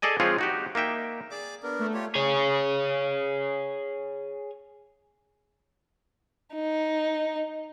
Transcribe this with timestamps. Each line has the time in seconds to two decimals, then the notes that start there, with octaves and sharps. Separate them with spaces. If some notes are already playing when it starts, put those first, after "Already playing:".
0.02 G#4 A4 D5 D#5 G#5
0.20 F3 G#3 C4 F4 G#4 C#5
0.38 D#4 F#4 G4
0.75 A#3 D#4 E5 G5
1.30 G#4 D5 D6
1.63 B3 D4 A#4
1.79 A3
1.94 F4 G4 C#5
2.15 G#4 C#5
6.54 D#4